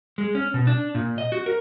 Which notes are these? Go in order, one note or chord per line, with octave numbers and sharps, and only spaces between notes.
G#3
C#4
B2
D4
A#2
D#5
F#4
A#4